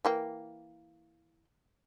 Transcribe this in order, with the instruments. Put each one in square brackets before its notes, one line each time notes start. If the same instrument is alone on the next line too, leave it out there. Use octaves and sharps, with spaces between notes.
[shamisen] E3 A#3 G5